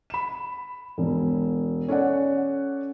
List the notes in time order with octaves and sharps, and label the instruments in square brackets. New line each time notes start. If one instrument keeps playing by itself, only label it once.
[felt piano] B5 E7
E1
C#4 A4 D5 F#5